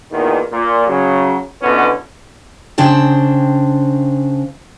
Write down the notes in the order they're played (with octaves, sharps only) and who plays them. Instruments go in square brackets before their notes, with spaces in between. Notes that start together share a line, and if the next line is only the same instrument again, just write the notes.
[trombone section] E2 A#2 D#3
A#2
C#3 F#3
A#1 B2 D3 B3 C#4 E4
[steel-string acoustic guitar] C#3 D4 C5 G5